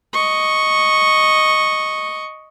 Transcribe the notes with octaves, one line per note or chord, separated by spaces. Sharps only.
D#5 C#6